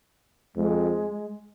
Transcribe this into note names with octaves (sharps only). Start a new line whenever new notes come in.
F2 G#3